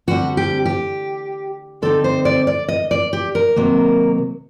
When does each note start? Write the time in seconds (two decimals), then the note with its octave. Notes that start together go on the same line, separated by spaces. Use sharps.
0.07 D3 G3 C4 F#4
0.37 G4
0.65 G4
1.82 D3 G3 C4 D#4 A4
2.04 C5
2.25 D5
2.47 D5
2.68 D#5
2.91 D5
3.13 G4
3.35 A#4
3.56 C3 D#3 F#3 A#3